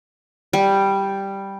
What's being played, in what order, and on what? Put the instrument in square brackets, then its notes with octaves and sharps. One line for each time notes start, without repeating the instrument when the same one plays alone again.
[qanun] G3